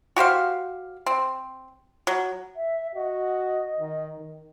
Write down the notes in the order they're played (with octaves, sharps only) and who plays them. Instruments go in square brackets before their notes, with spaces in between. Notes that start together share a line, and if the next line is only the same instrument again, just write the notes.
[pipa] F#4 G4 C5 F5
C4
F#3
[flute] E5
[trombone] F#4 [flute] D#5
[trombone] D#3
D#3